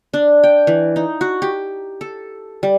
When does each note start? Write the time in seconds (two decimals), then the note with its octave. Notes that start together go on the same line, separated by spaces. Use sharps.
0.14 D4
0.44 G5
0.67 E3
0.96 D#4
1.21 F#4
1.42 G4
2.01 A4
2.63 G3